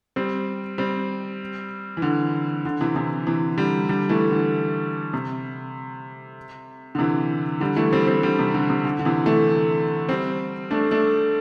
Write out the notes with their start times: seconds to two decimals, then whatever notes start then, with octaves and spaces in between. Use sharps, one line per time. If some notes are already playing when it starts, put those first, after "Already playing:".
0.16 G3 C4
0.78 G3 C4
1.97 E3
2.02 D3
2.65 D3
2.81 C3 E3
2.96 C3 E3
3.27 C3 E3
3.58 D3 G3
3.89 D3 G3
4.09 E3 A3
4.31 D3
5.13 C3
6.95 D3
6.99 C3 E3
7.60 D3 G3
7.76 E3 A3
7.93 G3 C4
8.07 G3 C4
8.23 D3 G3
8.39 C3
8.54 D3
8.70 C3
8.85 D3
8.99 D3
9.05 C3 E3
9.26 E3 A3
10.09 G3 C4
10.71 A3 D4
10.91 A3 D4